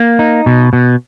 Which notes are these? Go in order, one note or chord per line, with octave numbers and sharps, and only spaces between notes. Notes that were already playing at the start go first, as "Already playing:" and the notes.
Already playing: A#3
D#4
B2
B2